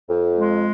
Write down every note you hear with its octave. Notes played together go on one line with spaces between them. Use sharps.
F2
G#3